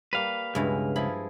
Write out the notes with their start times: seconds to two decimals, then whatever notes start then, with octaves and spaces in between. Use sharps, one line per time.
0.13 G3 A#3 B4 F5
0.55 C#2 G2 B2 G#3 E4
0.96 F3 E4 G#4 B5